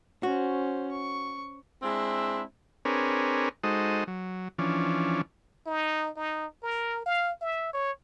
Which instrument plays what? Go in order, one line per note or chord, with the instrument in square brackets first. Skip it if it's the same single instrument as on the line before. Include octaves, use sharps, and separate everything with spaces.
[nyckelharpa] C#4 C5 [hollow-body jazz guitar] F#4
[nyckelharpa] C#6
[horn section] G#3 C4 D4 E4
[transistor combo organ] C4 D4 G#4 A#4 B4 C#5
G#3 D#4 F#4 A4 C5 D#5
F#3
E3 F3 C#4 D4
[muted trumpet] D#4
D#4
A#4
F5
E5
C#5